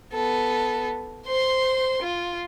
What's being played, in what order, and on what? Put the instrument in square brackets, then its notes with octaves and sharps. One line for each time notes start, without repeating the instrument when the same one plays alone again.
[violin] B3 A4
C5 C6
F4